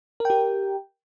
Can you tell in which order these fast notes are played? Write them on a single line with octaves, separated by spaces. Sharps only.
A#4 G5 G4